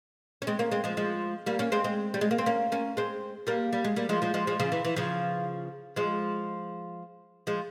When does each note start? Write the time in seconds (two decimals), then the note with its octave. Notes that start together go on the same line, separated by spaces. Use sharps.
0.42 C#4
0.47 G#3 C4
0.59 A#3 C#4
0.71 G#3 C4
0.84 F3 G#3
0.97 F3 G#3
1.46 G3 A#3
1.59 A#3 C#4
1.72 G#3 C4
1.84 G#3 C4
2.14 G3
2.21 G#3
2.31 A#3
2.38 C4
2.46 A#3 C#4
2.72 A#3 C#4
2.97 G#3 C4
3.47 G3 A#3
3.73 G3
3.84 G#3
3.96 G3 A#3
4.09 F3 G#3
4.22 F3 G#3
4.34 F3 G#3
4.47 F3 G#3
4.60 C#3 F3
4.72 E3
4.85 E3
4.96 C#3 F3
5.96 F3 G#3
7.47 F3 G#3